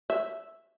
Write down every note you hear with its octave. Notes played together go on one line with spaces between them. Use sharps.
E5